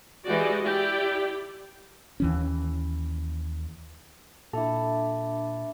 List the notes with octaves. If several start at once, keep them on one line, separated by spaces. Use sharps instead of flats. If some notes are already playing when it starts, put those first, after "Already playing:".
E3 G#3 F#4 G4 D5 D#5
E4 G4 D5 G5
D#2 E3 C#4
A#2 D4 E4 A4 E5 D6